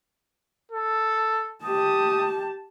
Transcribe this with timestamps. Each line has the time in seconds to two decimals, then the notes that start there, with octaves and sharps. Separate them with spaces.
0.71 A4
1.63 G4 A5 D#6